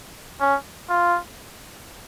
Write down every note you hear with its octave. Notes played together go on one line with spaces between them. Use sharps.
C#4
F4